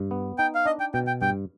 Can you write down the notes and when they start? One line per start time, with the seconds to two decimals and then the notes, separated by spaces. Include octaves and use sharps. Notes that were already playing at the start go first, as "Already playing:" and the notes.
Already playing: G2
0.11 B3
0.38 D#4 G5
0.55 F5
0.66 D4 D#5
0.80 G5
0.94 B2 G5
1.07 G5
1.22 G2 G5